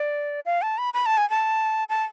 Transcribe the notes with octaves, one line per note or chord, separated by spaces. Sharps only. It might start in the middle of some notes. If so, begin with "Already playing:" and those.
Already playing: D5
F5
A5
B5
B5
A5
G#5
A5
A5